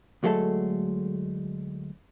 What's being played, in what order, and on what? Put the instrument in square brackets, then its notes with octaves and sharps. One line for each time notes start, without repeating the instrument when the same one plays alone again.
[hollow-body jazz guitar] D2 F#3 G#3 A3 A4